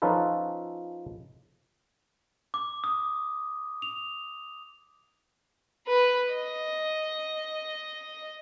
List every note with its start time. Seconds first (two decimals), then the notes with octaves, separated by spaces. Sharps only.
0.02 F3 C#4 D#4 F4 A4 B4
2.54 D6
2.84 D#6
3.82 F7
5.87 B4
6.32 D#5